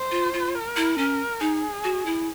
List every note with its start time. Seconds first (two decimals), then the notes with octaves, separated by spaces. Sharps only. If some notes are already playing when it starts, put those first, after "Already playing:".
Already playing: C5
0.11 F4
0.33 F4
0.55 A#4
0.76 E4
0.97 C#4 A#4
1.41 D#4 G#4
1.84 F#4
2.06 E4